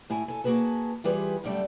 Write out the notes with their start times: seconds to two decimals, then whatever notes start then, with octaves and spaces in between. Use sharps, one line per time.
0.10 A2 E4 G#5
0.28 A4 G#5
0.44 A#3 F#4 G#4 B4 A5
1.04 E3 G3 F4 G4 G#4 B4
1.44 F#2 D3 G3 A3 G5